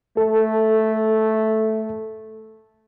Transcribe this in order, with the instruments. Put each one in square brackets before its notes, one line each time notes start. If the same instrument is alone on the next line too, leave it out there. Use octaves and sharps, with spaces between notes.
[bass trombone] A3 [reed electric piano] A4